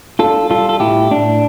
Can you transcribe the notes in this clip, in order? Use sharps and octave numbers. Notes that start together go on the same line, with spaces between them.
D4 F4 A4
G3 F4 A4
A4
A2 E4 G4
A2 D4